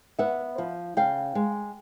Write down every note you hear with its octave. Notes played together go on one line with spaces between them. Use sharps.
B3 E5 F#5
F3
C#3 F5 G5
G#3